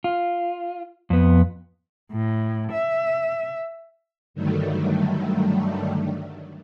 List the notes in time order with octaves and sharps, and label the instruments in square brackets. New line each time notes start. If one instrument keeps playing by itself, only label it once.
[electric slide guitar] F4
F2 B3
[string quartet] A2
E5
[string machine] G2 D3 D#3 F#3 G3 A3